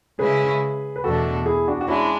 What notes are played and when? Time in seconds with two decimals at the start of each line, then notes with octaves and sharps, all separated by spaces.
0.19 C#3 G#3 C#4 E4 G#4 B4
0.96 B4
1.04 E2 B2 A3 D4 F#4 A4
1.46 E4 G#4
1.68 D4 F#4
1.81 F#4
1.88 G#3 C#4 D4 E4